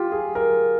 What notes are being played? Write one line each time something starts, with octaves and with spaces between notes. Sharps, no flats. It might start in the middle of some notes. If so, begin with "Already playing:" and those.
Already playing: F4 G4
G#4
A#4